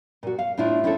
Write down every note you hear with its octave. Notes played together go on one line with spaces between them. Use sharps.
A#2 F#4
F5
A2 D4 E4 F4
C4 C#4 E4 F4 G#4 A4